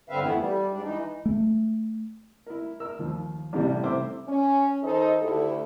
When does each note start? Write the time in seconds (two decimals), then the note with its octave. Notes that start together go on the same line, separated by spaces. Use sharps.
0.10 G2 D3 C4 B4 E5 F5
0.22 F2 E3 A3 B3 E4
0.39 G3
0.71 G#2 D4
0.83 E3 D#4
1.26 A3
2.46 E4 A#4
2.80 A#4 E6
2.99 D#2 F3
3.53 A1 A2 C3 G3
3.83 C3 A3 E4 C5 E5 D6
4.27 C#4
4.83 D#3 D#4 A4 C5 D#5
5.22 D2 A3 E4 G4 A4